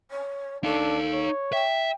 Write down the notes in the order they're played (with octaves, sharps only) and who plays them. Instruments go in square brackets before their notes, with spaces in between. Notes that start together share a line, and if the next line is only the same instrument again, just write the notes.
[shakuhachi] C#5
[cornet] D4 [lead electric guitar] D#4 F5 [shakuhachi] A4
[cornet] C#5
[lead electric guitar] E5 [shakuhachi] G5